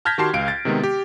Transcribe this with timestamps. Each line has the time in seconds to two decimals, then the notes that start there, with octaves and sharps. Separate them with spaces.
0.05 A5 F6 G6 G#6 A#6 B6
0.18 D#3 F#4 G4 A5 C6 C7
0.33 C#2 F5 D7
0.48 A6
0.65 C3 D#3 G#3 B3
0.84 G4